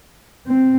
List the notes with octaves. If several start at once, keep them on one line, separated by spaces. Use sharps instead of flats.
C4